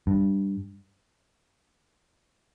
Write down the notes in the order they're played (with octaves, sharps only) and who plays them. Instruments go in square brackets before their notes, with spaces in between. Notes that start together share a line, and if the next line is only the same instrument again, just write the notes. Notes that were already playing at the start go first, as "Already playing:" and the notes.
[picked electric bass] G2